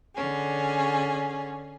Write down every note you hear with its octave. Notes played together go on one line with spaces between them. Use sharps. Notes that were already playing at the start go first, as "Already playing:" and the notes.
D3 C#4 G#4